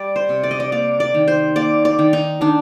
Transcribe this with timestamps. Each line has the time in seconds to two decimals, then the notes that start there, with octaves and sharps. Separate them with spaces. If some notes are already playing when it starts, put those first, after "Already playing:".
Already playing: G3 D5
0.16 C5
0.29 C3
0.43 D5
0.51 D#5
0.60 D5
0.72 A#3 D5
1.00 D5
1.14 D#3
1.28 C5
1.56 A#3 D5
1.85 D5
1.99 D#3
2.13 D#4
2.41 D#3 D4